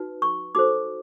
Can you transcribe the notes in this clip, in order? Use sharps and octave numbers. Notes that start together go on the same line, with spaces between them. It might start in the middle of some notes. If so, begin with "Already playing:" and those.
Already playing: D#4 F#4 B4
C#6
D#4 F#4 A4 C5 D6